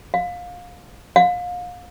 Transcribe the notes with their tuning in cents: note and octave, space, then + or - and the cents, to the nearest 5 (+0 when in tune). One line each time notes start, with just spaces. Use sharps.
F5 +25
F5 +35